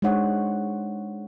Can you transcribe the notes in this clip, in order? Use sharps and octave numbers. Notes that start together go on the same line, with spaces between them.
G#3 D4 D#4 C5 C#5 F#5